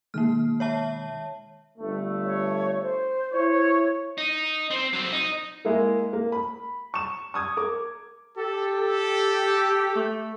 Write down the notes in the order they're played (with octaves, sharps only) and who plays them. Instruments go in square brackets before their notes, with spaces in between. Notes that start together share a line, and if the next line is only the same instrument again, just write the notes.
[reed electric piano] B2 D#3 G#3 [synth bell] A#3 F6
[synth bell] C#5 E5 A5
[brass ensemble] G1 G2 A3
[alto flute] C#5
C5
[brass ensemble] E4 C#5
[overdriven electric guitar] D#4
C4
F#3 C4
D#4
[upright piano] G#3 A#3 E4 A#4
A#3
B5
C#6 E7
C#6 D#6 G#6
A#4 D6
[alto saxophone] G4 [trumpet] A4
[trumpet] A4
[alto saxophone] A3